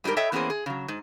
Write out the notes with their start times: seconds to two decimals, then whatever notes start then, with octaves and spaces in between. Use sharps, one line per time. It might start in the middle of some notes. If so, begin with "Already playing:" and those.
0.04 G#2 G3 D#4 G4 A#4
0.16 A4 C#5 D#5 E5 G5
0.32 E3 A#3 B3 C#4 G#4 C5
0.50 G#4
0.66 C#3 F#3
0.88 G#2